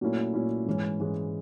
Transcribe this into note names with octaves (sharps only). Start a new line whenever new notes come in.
A#2 F#3 A3 C#4 E4
A#2 F#3 A3 C#4 E4
G#2 E3 G#3 C#4
G#2 E3 G#3 C#4